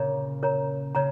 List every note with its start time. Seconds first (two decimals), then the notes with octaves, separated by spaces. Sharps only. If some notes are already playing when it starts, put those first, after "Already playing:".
Already playing: A#2 C#3 A#4 C#5 A#5
0.43 A#4 C#5 A#5
0.95 C#3 C#5 A#5